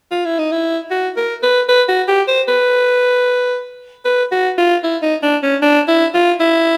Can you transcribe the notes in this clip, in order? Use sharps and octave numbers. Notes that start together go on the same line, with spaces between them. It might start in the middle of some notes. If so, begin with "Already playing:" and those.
F4
E4
D#4
E4
F#4
A#4
B4
B4
F#4
G4
C5
B4
B4
F#4
F4
E4
D#4
D4
C#4
D4
E4
F4
E4